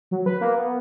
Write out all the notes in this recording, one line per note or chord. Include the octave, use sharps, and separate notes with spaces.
F#3
B4
A#3
B3